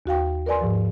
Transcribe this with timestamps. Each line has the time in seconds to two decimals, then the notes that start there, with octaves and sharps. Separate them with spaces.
0.06 D#2 F#4 F5 G5
0.46 A#4 B4 D5 G#5 C6
0.61 G#2 F3